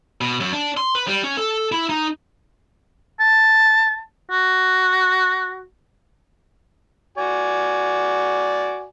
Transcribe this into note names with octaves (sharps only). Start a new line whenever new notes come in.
B2
F#2
D4
C6
B4
G3
C#4
A4
E4
D#4
A5
F#4
F#4 D5 G#5